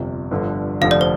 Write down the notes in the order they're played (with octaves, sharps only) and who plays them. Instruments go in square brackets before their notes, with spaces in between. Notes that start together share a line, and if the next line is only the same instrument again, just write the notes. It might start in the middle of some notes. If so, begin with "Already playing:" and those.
Already playing: [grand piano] G1 F2 C3
G1 G2 D3 F3
[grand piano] F1 F2 D3 F3 [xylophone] F5
[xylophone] D5
C5